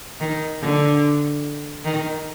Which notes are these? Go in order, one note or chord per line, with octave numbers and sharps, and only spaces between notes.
D#3
D3
D#3